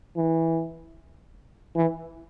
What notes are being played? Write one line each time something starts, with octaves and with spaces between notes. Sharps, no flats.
E3
E3